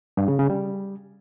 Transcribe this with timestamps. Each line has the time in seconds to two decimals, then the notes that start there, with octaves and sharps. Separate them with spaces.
0.17 G2
0.28 C#3
0.39 C#3
0.50 G3